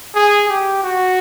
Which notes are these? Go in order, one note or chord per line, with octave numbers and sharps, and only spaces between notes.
G#4
G4
F#4